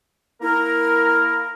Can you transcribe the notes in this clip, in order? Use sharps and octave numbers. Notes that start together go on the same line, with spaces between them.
A#3 E4 A#4